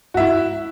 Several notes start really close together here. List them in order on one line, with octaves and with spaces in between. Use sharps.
F#4 E5 E4